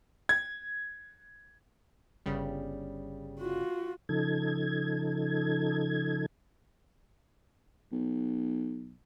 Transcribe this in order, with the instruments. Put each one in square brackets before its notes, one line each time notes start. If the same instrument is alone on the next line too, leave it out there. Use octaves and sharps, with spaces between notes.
[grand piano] G#6
[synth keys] G1 C#3 G3
[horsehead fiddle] F4 F#4
[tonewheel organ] C#3 F3 D#4 A4 G#6
[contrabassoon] B1